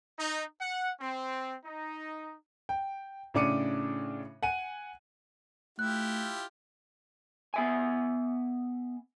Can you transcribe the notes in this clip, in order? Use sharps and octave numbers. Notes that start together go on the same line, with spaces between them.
D#4
F#5
C4
D#4
G5
A2 C#3 D4 D6 C#7 D#7
F#5 G#5 D#7
A3 E4 F4 G4 F#6
B3 E5 G#5